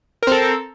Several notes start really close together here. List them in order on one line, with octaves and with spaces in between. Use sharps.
A#4 C4 A4